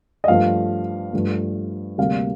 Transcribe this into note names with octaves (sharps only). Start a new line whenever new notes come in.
D#5
G2 F3 A3 F5
G2 F3 A3
D2 C3 G3 A#3 F5